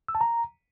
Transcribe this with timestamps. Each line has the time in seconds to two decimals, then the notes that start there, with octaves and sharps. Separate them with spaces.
0.08 E6
0.15 A5
0.21 A#5